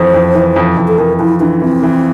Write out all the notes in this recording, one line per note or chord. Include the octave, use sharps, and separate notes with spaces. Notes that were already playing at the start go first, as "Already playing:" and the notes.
Already playing: F2 E3 C5
F2
E3
F2
F2
A4
F2 A#4
F2 E4
E3 D4
E3 C4
E3